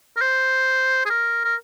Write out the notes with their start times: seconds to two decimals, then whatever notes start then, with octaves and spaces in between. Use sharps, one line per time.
0.17 A#4
0.21 C5
1.06 G#4
1.10 A#4
1.44 A#4